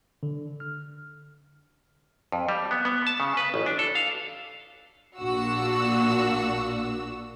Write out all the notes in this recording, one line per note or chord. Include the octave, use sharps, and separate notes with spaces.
D3
F6
F2
G3
B3
B3
A5
C#3
B4
A1
D4
A4
F5
A#1 A#2 D4 F#4 E6